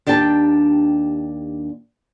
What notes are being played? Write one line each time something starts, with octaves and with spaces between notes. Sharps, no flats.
D#2 D4 G4 G5 A5